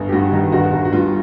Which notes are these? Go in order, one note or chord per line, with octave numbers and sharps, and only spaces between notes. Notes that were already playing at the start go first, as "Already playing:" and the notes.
Already playing: G1
G4
G2 F#4
D#3
G1 F#4
G1
F#4
G2 F4